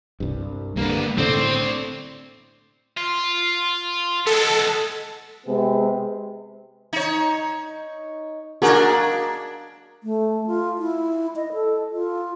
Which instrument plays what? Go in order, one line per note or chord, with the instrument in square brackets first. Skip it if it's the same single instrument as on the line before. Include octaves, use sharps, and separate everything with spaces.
[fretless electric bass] C2 G2
[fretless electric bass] G2 D3 [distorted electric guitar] A#3 B3
[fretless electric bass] A2 D3 [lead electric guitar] C4 [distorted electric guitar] C5 D5
[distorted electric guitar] F4
[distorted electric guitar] G#3 B3 [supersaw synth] A4
[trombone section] C3 G#3 B3 C4 G#4
[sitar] D#4 C#5
[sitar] A#3 D4 [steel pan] F#4 G#4 A#4
[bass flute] A3
F4
E4
D#5
A4
F4